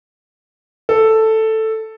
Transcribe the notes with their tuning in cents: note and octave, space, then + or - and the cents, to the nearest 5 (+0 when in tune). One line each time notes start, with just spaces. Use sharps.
A4 +5